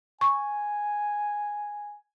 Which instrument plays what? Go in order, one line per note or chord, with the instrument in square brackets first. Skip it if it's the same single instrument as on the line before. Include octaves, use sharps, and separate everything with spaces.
[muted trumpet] G#5 [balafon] C#6